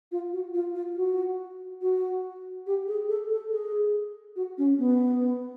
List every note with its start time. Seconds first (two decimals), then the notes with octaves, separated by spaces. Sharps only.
0.12 F4
0.33 F#4
0.54 F4
0.75 F4
0.96 F#4
1.82 F#4
2.67 G4
2.88 G#4
3.09 A4
3.30 A4
3.52 G#4
4.36 F#4
4.58 C#4
4.78 B3